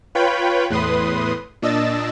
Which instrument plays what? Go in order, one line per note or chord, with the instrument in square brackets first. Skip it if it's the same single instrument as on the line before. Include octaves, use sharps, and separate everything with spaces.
[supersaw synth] F4 B4 C#5 G5 B5
E2 A2 B4 C6 D#6
A#2 D4 D#5 E6 A6